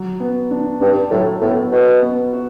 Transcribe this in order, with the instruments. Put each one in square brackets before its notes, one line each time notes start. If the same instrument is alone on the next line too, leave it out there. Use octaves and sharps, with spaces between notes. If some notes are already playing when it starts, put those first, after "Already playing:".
Already playing: [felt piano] F#3
B3
D4
[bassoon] G2 [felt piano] D4
[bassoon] A2 [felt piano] F#3
[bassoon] A2 [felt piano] B3
[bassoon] B2 [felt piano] A4
[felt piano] B3
F#4